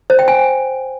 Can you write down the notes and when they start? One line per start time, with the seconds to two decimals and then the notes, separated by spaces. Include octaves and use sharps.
0.10 C5
0.19 G5
0.28 G#5